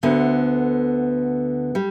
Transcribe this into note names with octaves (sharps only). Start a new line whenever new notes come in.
D2 D3 B3
G3